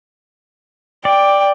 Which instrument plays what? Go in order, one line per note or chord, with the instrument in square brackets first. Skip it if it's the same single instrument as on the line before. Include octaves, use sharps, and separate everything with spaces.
[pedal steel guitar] D5 [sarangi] G5